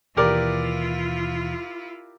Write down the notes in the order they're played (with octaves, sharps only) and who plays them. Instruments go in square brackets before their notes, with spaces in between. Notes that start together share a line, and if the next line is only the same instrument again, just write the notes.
[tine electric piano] D#2 B2 E3 [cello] E4 F4 [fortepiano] G4 A#4 D5